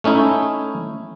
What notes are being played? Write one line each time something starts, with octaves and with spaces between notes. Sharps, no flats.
A3 C#4 D#4 E4